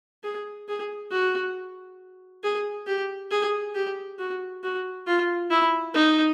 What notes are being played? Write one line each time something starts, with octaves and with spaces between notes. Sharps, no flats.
G#4
G#4
F#4
G#4
G4
G#4
G4
F#4
F#4
F4
E4
D#4